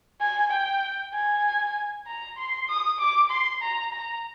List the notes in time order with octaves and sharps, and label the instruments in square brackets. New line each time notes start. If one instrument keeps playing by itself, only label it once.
[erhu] G#5
G5
G#5
A#5
C6
D#6
D6
C6
A#5
A#5